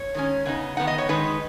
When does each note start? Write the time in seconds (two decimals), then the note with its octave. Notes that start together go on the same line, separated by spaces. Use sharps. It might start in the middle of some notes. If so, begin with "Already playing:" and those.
Already playing: C#5
0.15 D#3 G#3 C#4
0.45 C#3 B3 D#4
0.77 D#3 B3 D#4 F#5
0.87 D#5
0.98 C#5
1.09 D#3 G#3 D#4 B4